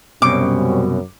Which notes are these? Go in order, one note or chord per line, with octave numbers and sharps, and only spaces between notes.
C2 F#2 B2 G3 C4 C#4 D6